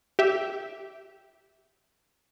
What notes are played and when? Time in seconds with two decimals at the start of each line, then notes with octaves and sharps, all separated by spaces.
0.19 G4 E5